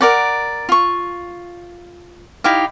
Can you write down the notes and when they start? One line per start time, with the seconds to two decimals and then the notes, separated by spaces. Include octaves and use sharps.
0.01 A#4 D5 F#5
0.69 F4 C#6
2.44 D#4 E4 G4 F5